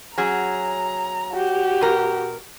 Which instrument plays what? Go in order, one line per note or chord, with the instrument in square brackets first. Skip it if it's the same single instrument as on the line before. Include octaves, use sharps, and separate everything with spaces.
[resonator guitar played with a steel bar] F#3 C#4 G#4 [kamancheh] A#5
[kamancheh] F#4 G4
[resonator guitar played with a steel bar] B2 A#4